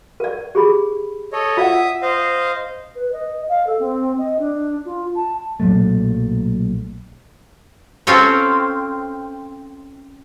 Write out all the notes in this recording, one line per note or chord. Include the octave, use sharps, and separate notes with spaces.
A#4 D5
G4 G#4 B5
A4 C#5 D#5
F4 D5 E5 F#5 D#6
C5 D#5 F5
B4
D#5
F5
A4
C4
D#5
D4
F4
A5
B1 A#2 F#3 A3
C4 C#4 F4 A4 C#5